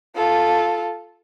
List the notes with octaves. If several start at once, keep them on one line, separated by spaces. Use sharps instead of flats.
F4 A4